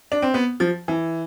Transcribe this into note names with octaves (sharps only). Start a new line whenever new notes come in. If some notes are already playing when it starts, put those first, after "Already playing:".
D4
C4
B3
F3
E3